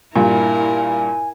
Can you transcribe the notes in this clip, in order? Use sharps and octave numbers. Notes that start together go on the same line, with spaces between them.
G2 A#2 E4 A#4 G#5